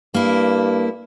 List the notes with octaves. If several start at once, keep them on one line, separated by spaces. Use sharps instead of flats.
G2 A#3 E4